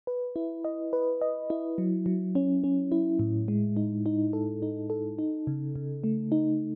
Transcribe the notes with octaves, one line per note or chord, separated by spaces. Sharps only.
B4
E4
D#5
B4
D#5
E4
F#3
F#3
C#4
C#4
E4
A2
G#3
D#4
D#4
A4
D#4
A4
D#4
C#3
C#3
A3
D#4